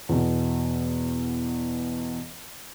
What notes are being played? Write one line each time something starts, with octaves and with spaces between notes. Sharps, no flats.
E2 B2